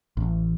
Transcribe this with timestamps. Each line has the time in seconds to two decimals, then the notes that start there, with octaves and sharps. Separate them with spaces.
0.17 A1